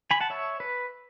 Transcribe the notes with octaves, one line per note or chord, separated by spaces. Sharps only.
G#5 B5
F#5 A5
C#5 E5
B4